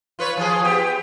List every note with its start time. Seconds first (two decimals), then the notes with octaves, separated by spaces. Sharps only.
0.19 F4 B4 C#5
0.37 F3 F4 G#4
0.65 B3 G4